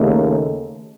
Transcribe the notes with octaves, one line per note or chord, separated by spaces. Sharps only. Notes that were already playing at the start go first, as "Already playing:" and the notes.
Already playing: D#2 C#3 A3